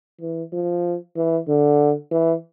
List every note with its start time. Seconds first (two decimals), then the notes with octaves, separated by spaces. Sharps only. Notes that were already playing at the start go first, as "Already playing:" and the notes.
0.21 E3
0.53 F3
1.16 E3
1.48 D3
2.11 E3